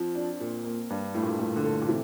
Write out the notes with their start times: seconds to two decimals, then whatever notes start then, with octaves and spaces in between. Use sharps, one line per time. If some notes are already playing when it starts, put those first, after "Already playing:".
Already playing: F2 F3
0.15 D4
0.40 A#2
0.64 A#3
0.90 G2 D4
1.14 A2 A3
1.22 A#2
1.31 A2
1.39 A#2 A3
1.56 D3
1.65 A4
1.81 A#2
1.88 C3 E3